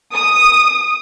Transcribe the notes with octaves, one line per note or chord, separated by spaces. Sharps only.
D#6